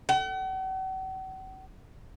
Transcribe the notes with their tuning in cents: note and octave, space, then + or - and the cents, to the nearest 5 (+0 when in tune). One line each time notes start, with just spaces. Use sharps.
F#5 +45